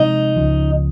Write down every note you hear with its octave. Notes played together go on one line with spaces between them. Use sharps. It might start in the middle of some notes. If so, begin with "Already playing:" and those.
Already playing: C3 F3 G#3 C4 D#4
C#2 C#3 F3